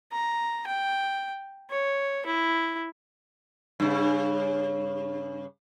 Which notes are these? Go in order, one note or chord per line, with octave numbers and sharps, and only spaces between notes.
A#5
G5
C#5
E4
G2 C#3